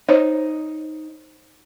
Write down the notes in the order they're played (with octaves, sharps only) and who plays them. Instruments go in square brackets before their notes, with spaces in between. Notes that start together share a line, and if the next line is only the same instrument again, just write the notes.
[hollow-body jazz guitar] D#4 [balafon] C5 C#5